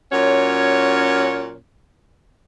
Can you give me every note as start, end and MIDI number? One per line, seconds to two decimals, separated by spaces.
0.12 1.56 46
0.12 1.56 54
0.12 1.56 61
0.12 1.56 73